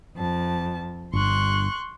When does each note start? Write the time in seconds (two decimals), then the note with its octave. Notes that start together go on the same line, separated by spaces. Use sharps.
0.16 F2 A5
1.13 G1 G2 C6 C#6 F#6